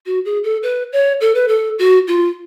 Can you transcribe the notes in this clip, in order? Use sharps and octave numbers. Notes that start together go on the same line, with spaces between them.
F#4
G#4
A4
B4
C#5
A4
B4
A4
F#4
F4